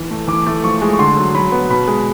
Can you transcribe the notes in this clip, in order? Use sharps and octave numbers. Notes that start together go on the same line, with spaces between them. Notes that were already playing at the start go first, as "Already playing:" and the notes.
Already playing: E3
A3
E3 D6
A3
F3 C#6
G#3
C#6
D3 C6
F#3
F#3 B5
B3
B2 B5
G#3